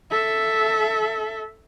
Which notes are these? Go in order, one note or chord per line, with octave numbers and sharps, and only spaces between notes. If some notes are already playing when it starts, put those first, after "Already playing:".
A4 E5